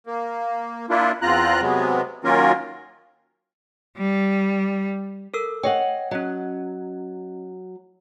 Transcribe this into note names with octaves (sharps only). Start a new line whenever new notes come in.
A#3
A#3 D4 E4 F4
E2 C4 F4 A#5 F#6
C3 F#3 G#3 B3
D#3 F#3 A#3 C#4 F4 A#4
G3
A4 A#4 E6
C#5 D#5 F#5 G5
F#3 C#4 D#5